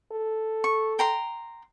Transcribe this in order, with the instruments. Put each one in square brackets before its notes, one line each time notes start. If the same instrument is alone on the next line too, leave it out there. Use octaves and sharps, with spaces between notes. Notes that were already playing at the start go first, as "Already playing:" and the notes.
[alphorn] A4
[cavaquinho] C#6
G5 A#5 C6